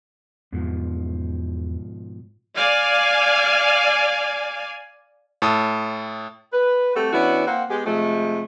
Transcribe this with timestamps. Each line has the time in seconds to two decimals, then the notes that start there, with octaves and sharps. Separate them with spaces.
0.52 E2 G#2 B2 F3
2.56 D5 F5 G#5
5.42 A2 A4 D#6
6.53 B4
6.95 G3 A3 C4 F#4 G4 A4
7.13 E3 B3 C#4 D4 E4 F#4
7.46 A#3 C4 F#5
7.69 G#3 B3 G4
7.86 C3 F3 G#3 A3